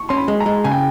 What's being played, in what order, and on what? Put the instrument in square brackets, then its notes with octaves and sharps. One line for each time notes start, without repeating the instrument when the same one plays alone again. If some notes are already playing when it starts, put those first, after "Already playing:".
Already playing: [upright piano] C#6
[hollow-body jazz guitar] C#4 [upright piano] C6
[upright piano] B5
[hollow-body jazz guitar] G#3
[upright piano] A#5
[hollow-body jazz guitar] G#3
[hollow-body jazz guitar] C#3 [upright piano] G#5
[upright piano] G5